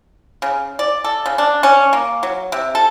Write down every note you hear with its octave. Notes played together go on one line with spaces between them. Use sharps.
C#3
D5
A4
C#3
D4
C#4
A#3
F#3
C3
A4